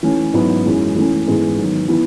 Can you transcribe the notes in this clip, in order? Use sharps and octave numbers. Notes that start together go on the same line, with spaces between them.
E3 A3 C#4
G#2 F#3 B3 E4
F#2 E3 G#3
E3 A3 C#4
G#2 E3 G#3 B3
D#3 F#3 B3
E3 B3 E4